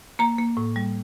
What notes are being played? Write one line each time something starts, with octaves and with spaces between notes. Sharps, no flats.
A#3 A#5
A#3
A2
G3